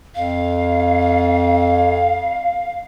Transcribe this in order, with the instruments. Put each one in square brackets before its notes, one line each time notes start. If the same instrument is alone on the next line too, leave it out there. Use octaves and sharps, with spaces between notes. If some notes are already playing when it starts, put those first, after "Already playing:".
[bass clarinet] F2 [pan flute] F5